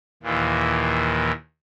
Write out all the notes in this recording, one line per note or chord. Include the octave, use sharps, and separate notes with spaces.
D#2 A#2 E3